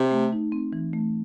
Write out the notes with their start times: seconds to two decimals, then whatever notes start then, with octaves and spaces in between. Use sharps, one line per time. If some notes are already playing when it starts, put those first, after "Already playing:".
Already playing: C3
0.11 A3
0.33 D#4
0.52 C4
0.73 E3
0.93 A3